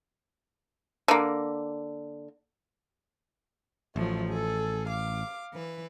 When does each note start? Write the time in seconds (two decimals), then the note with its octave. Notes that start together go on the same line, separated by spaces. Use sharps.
1.08 D3 A#3
3.96 A1 F3 F#3 A3
4.28 G#4 A4
4.87 F5 D6
5.52 E3 B4